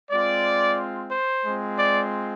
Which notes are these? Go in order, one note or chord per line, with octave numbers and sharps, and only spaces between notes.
G#3 C4 F4 D5
C5
G#3 C4 F4
D5